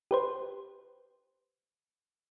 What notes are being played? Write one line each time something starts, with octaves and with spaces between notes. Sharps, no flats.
G4 B4 C5